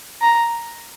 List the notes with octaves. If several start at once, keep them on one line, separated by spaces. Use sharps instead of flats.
A#5